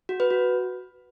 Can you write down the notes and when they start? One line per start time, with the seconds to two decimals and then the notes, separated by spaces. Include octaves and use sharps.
0.09 F#4
0.20 B4
0.31 F#4